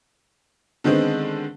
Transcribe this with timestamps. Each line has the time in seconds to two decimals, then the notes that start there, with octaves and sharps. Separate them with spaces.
0.84 D3 D#3 G#3 B3 C4